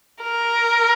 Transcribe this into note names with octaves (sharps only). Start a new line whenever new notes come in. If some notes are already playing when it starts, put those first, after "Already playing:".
A#4